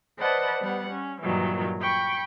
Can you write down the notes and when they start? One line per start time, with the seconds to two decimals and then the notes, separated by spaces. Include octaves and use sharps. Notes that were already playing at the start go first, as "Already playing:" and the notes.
0.18 B4 C5 D5 D#5 F#5 A5
0.59 G3 B3 F#5
0.90 C#4
1.22 G2 A#2 D#3 E3 F#3
1.80 G5 B5 C#6